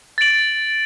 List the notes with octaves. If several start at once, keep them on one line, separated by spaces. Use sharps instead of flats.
A6 D7 F#7